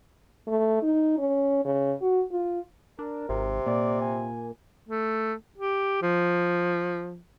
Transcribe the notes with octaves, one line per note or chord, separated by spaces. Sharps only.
A3
D#4
C#4
C#3
F#4
F4
D4 A#4
G#1 C3
A#2 D5
G#5
A3
G4
F3